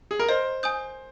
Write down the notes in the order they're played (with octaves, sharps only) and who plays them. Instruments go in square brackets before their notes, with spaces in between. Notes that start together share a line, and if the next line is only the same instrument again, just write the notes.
[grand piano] G#4
A#4
[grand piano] C5 [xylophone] D#5
[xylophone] G#5 D#6 G6